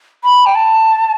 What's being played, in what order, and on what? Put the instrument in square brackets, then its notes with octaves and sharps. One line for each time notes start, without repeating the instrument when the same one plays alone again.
[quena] B5
G5
A5